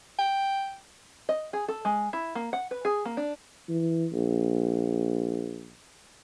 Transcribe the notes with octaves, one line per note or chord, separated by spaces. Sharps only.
G5
D#5
G#4
A4
G#3
E4
A#3
F#5
B4
G#4
A#3
D4
E3
A#1